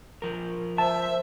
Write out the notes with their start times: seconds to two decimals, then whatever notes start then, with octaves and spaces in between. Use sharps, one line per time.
0.22 F3 A#4
0.78 C5 E5 A5